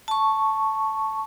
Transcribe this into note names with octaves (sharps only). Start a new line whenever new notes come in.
A5 C#6